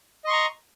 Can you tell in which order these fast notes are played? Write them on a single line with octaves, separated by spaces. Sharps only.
D#5 C6 C#6 A#5